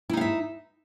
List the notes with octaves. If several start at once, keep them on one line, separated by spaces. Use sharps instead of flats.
D#4 E4 E5 F5